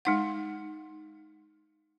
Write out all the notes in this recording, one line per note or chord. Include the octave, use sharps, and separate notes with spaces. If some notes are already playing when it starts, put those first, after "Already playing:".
G#3 D#4 F#5